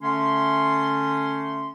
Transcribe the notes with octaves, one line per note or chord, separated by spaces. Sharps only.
D3 A3 C#4 C6